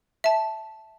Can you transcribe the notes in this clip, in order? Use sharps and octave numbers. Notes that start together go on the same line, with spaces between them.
E5 A5